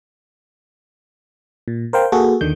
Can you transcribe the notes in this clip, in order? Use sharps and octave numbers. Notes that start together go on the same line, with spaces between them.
A#2
A#4 C5 F5 G5
A#3 F#4 G#4 A4
D#2 D3 D#3 G6